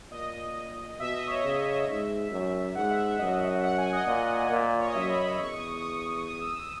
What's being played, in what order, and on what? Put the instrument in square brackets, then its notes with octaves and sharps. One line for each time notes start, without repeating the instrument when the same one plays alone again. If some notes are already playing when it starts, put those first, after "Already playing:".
[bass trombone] A#2 [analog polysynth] D#5
[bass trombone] B2 [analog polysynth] E5
[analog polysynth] D#5
C#5
[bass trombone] C#3 [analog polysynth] D#5
[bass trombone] G#2 [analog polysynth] E5
[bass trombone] F#2
[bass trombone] G#2 [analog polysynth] F#5
[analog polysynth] E5
E5
[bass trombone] F#2 [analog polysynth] D#5
[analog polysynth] F#5
G#5
D#5
[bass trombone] A#2
A#2
[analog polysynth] C#5
D#5
[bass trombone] F#2 [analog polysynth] E5
[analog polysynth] B5
B5
[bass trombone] E2 [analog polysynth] C#6
[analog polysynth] D#6
C#6
D#6
C#6
C#6
D#6
E6
D#6